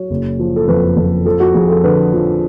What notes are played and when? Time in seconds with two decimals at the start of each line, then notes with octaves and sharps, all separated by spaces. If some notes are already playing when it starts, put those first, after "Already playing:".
Already playing: F#3 C#5
0.10 F#1
0.39 F3
0.56 A4
0.68 F2 B4
0.97 F2
1.25 F3 A4
1.40 F#4
1.55 F2 G#4
1.69 A4
1.84 D3 B4
2.13 F3